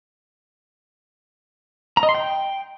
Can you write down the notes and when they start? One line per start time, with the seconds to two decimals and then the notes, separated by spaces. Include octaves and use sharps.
1.97 A#5
2.03 D#5
2.09 C6
2.15 G5